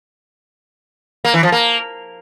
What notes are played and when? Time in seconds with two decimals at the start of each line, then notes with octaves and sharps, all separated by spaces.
1.25 A#3
1.34 E3
1.43 F3
1.52 A#3